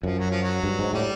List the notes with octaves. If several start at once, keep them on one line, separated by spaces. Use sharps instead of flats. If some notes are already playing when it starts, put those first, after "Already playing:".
F#2 F3
F#3
F3
F#3
G2
G#2
A2 G3